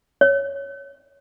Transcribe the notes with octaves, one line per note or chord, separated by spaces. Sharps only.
C#5